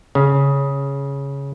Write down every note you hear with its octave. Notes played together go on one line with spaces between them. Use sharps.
C#3